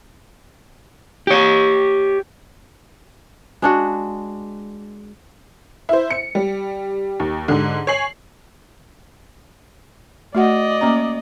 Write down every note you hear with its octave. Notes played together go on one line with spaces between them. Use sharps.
G4 C#5
G#3 D4 F#4
E4 C5
C#7
G3
D#2
G#2 D3
C#5 G#5 C7 F#7
A3 F#4 D5 D#5 F#5
A#3 C#4 A#5